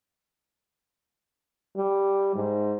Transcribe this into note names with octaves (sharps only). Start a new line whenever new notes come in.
G3
G#2